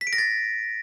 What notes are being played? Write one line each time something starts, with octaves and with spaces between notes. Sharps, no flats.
B6
D7
A#6
A6